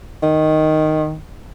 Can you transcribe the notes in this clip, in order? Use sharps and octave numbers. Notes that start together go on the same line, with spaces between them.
D#3